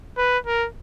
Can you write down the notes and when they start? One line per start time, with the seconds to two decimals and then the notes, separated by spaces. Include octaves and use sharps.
0.17 B4
0.47 A#4